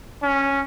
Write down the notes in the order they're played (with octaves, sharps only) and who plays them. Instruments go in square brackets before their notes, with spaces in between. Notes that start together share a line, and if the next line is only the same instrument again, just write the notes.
[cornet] C#4